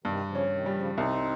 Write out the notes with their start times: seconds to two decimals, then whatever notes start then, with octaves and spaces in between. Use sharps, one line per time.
0.04 G2 C3 D#3
0.28 C#3 F3
0.35 C#4
0.51 C3 D#3
0.66 D#3 G3
0.74 C#3 F3
0.97 C2 C4 D#4